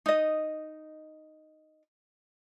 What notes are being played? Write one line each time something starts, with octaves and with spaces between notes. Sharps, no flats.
D#4 D#5